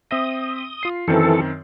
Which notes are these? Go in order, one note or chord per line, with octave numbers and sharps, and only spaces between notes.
C4 E5 D#6 A#6
F4 C7
F#2 D#3 E3 C4 A4